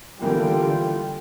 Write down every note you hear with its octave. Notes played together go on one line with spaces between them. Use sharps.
D3 E3 G3 A#3 B3 F4 G5